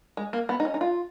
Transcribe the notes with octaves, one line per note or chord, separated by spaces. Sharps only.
G#3
A#3
B3
D#4
C#4
D#4
F4